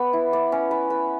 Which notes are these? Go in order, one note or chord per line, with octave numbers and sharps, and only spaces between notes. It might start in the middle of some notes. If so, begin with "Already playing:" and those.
Already playing: B3 D5
E4
D5
C#4
B4
B4